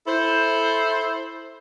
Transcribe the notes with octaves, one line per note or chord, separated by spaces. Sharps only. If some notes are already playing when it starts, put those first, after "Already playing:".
E4 A4 C5